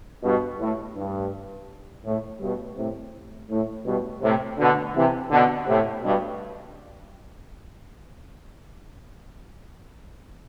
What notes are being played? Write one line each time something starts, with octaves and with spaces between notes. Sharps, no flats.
G2 B2
A2
G2
A2
G2 B2
A2 C3
A2
G2 B2
A2 C3
B2 D3
C3 E3
B2 D3
A2 C3
G2 B2